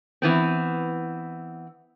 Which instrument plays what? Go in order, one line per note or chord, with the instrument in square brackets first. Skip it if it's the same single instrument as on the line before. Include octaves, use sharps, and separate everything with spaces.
[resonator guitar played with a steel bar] E3 B3 C4